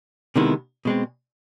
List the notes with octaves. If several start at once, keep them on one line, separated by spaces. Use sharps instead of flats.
C3 D#3 G#3 B3 E4
B2 G#3 C4